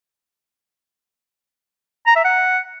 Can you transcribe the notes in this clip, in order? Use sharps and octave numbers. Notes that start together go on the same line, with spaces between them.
A#5
E5
F#5